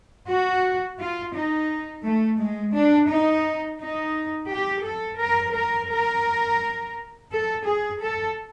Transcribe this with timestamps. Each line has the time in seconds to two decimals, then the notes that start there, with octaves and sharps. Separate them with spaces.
0.28 F#4
0.98 F4
1.34 D#4
2.04 A3
2.39 G#3
2.73 D4
3.09 D#4
3.80 D#4
4.50 G4
4.84 A4
5.20 A#4
5.56 A#4
5.91 A#4
7.31 A4
7.66 G#4
8.01 A4